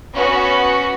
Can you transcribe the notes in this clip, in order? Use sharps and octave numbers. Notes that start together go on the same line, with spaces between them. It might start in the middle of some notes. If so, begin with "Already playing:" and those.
B3 C#4 F#4